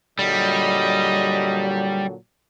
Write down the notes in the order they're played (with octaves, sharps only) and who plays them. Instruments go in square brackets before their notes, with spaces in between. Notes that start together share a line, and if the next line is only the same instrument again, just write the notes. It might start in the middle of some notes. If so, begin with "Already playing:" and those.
[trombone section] A#2 D3 F#3 [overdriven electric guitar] G3 [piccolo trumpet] D#5